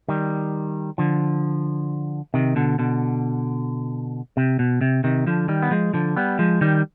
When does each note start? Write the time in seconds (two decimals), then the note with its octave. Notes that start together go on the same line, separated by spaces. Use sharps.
0.08 D#3 G3
0.98 D3 F3
2.34 C3 D#3
2.56 B2 D3
2.79 B2 D3
4.37 C3
4.59 B2
4.81 C3
5.04 C3 D#3
5.27 D3 F3
5.48 D#3 G3
5.62 B3
5.71 F3 G#3
5.94 D3 F3
6.17 G3 B3
6.39 F3 G#3
6.61 D#3 G3